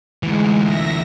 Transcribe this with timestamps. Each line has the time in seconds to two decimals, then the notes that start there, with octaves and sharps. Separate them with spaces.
0.23 D2 E3 G#3
0.62 E5 A#6